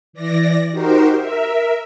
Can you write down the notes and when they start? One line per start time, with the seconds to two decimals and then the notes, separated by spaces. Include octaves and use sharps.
0.13 E3 D5 A#6
0.71 D#4 F#4 G4 A#4 C5
1.18 A#4 E5